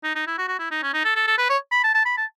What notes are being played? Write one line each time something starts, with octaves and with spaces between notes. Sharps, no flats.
D#4
D#4
E4
F#4
F#4
E4
D#4
C#4
D#4
A4
A4
A4
B4
C#5
B5
A5
A5
B5
A5